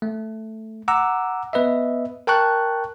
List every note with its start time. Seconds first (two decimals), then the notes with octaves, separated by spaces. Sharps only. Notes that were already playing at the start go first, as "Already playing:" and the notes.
0.02 A3
0.88 F#5 A#5 D6 E6
1.53 B3 B4 D#5 E5
2.27 A#4 G5 A5 C#6 F#6